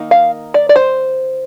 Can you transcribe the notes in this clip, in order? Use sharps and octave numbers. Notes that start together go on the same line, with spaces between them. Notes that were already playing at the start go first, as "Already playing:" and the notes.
Already playing: D#3 A#3 D#4
F5
D5
D5
C5